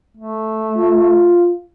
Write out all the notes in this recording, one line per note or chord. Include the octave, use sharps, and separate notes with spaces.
A3
F4